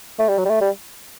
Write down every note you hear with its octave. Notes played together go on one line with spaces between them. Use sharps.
A3
G3
F#3
G3
A3
G3